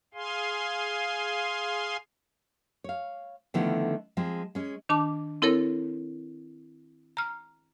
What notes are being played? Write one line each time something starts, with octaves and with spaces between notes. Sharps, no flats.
G#4 F5 G#5 C6
C#5 F5
D3 D#3 F3 A3 B3 E4
F3 G#3 C4
G#3 C#4
D#3 D4 A5 D6
C4 E4 A4 A#4 C#5
A#5 F6